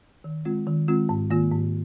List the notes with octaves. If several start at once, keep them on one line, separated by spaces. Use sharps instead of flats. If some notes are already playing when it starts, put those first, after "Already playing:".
D#3
G#3 C4 F4
D#3
G#3 C4 F4
G#2
D#3 A#3 F4
G#2